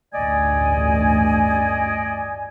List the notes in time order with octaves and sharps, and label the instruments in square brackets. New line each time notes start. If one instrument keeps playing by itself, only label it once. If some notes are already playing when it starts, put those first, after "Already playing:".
[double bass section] A1 D2 G2 [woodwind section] D5 D#5 G#5